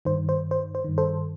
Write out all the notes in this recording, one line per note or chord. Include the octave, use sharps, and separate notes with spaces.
G2 D#3 C5
C5
C5
C5
G2 D#3
A4 C5